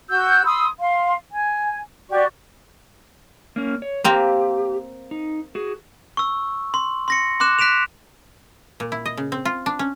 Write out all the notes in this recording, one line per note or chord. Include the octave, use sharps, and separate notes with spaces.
F#4 E6 G6
B5 C6 D#6 E6
F5 C6
G#5
F#4 G4 D5 C#6
A#3 C#4
C#5
A#3 C4 G4 A#5
D#4
F#4 G#4
C#6 E6
C6
C6 A#6 C#7
C6 D6 F#6 E7
F#6 B6 D7 E7 F7
A#2
E4
D#5
C#3
C4
F4
D4
C#4